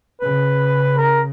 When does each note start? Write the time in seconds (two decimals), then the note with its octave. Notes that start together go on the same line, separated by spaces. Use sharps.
0.21 C#3 B4
0.98 A#4